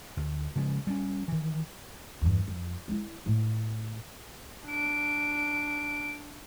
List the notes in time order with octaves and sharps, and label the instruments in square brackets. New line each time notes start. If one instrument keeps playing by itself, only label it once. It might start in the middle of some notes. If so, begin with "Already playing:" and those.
[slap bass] D2
C#3 F3 G#3
G3 A#3 C#4
D#3 E3
[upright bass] E2 G2
F2
G#3 E4
A2 A3
[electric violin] D4 D7